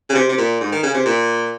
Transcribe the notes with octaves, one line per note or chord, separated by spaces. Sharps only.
C#3
C3
C3
A#2
G#2
D#3
C#3
C3
A#2